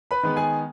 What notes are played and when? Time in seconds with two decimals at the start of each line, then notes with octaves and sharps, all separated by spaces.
0.11 B4 B5
0.23 D#3 G#3 B3
0.36 G#4 G#5